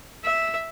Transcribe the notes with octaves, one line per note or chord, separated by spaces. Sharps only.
E5